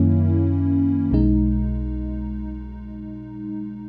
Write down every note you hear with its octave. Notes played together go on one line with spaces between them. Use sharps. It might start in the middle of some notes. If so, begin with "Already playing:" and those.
Already playing: F#2 D#3 A#3 C#4 E4
B1 B2 G#3 D#4